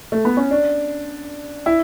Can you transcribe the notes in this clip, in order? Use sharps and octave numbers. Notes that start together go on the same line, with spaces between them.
A3
B3
C#4
D4
E4